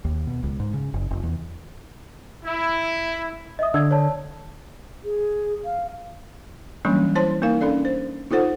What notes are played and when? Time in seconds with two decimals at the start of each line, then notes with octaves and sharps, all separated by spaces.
0.05 D#2
0.27 B2
0.43 C#2
0.60 G#2
0.73 C#3
0.94 F#1
1.11 F1
1.23 E2
2.45 E4
3.59 D#5 E5 D#6
3.74 D3 E6 G#6
3.91 C#5 D5 A5
5.04 G#4
5.65 F5
6.85 E3 F#3 G3 A#3 C#4 D4
7.15 E4 C5 C#5 A5 C6
7.42 A#3 D#4 A#4 F5
7.61 C#4 D4 A4 D5
7.85 C5
8.31 D#4 F4 A4 C5 F#5